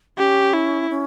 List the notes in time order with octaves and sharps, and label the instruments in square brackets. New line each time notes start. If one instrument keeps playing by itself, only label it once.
[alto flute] C#4 [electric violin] G4
[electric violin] E4
[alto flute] C#4